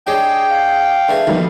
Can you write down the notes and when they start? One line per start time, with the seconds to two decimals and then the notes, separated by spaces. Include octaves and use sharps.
0.07 D4 G4 G#4 C#5 D#5 G5
0.50 F5
1.09 D3 A3 D4 G#4 B4
1.27 A#1 B2 D3 D#3 G3 B3